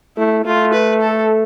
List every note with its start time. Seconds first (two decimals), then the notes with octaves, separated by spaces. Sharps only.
0.17 A3 E4
0.45 A3 F4
0.73 B4
1.01 A4